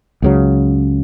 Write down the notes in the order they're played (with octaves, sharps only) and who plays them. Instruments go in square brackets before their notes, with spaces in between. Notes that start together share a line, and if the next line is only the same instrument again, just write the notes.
[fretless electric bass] C#2 C#3 F#3